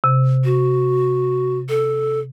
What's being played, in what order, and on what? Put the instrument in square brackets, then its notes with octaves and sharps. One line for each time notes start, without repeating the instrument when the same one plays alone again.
[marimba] C3
[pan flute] F#4
A4